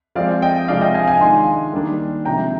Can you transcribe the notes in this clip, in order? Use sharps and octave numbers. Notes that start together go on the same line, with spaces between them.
F3 G#3 C4 D5 F5
D#5 G5
C3 F3 G#3 D4 D5 F5
D#5 G5
F5 G#5
F5 G#5
D#3 G#3 D4 G#5 C6
D#3 G3 A#3 D4
C3 F3 G#3 G5 A#5